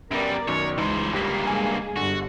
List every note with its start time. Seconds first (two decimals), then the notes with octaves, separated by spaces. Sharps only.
0.11 F#2 G3 B3 A#4 D5 D7
0.48 F#2 B2 D#3 C#5
0.78 C#2 E3 D#4 C5
1.13 G1 G2 A#3 G4 B6
1.47 G#3 G#4 G#5
1.97 G1 D3 F#4